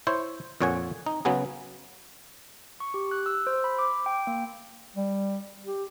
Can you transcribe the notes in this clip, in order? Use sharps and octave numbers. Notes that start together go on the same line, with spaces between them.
E4 C5 C#5
F2 A#2 C#5 F#5 G#5
D#4
C#3 F#3 B3 F#4 G#4
C#6
G4
F#6
E6
C5
B5
D6
G5
A#3
G3
G4